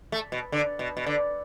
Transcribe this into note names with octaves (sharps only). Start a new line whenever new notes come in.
A3
B2
D3
B2
B2
D3